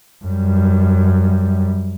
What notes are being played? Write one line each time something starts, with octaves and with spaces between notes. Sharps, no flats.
F#2 G3